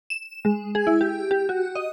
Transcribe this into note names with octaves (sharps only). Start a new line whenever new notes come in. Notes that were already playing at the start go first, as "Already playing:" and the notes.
E7
G#3
G#4
E4
G4
G4
F#4
D#5